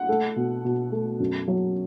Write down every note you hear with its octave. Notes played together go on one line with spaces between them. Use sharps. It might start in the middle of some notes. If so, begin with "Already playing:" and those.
Already playing: F#5
A3
B2
B2
A3
F#2
F#3